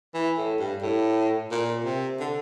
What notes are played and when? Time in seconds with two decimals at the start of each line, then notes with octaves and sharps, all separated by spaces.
0.14 E3
0.38 A2
0.59 G2
0.82 A2
1.51 A#2
1.85 C3
2.20 D3